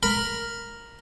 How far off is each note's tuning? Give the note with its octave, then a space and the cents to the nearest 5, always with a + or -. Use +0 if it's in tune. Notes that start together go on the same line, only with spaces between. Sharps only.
A#4 +0 B5 +0